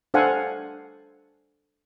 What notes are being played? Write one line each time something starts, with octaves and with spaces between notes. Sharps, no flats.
D4 A4 C5 F5 F#5 G#5